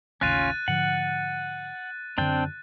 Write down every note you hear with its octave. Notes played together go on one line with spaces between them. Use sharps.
A1 D#2 C#3 C#4 F4 F#6 A6 D#7
G#2 D3 F3 F#5
F#2 D3 C4 D4 G5